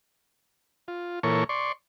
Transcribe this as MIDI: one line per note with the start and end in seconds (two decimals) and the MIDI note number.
0.88 1.19 65
1.23 1.44 46
1.23 1.44 52
1.23 1.44 69
1.23 1.44 70
1.23 1.44 73
1.23 1.44 85
1.49 1.72 74
1.49 1.72 84
1.49 1.72 85